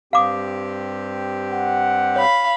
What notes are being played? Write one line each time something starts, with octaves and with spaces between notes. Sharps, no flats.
G2 C4 G4 F5 D6 D#6
F#5
C#5 F5 B5